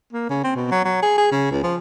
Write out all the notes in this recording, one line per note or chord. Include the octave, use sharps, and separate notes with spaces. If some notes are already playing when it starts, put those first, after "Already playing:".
A#3
C#3
C4
B2
F#3
F#3
G#4
G#4
C#3
C#2
F3